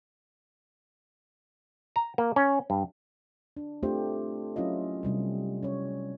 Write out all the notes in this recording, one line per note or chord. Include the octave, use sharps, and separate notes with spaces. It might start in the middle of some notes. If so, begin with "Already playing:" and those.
A#5
A#3
C#4
G2
D4
A3 C4 D4 F4 G4 C5
F#3 C#4 E4 F4 D#5
C3 G3 C4
C#4 C#5